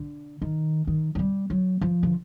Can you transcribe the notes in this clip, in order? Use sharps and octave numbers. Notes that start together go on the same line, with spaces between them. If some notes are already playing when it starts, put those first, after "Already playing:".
Already playing: D3
D#3
D#3
F#3
G3
F#3
F3
D3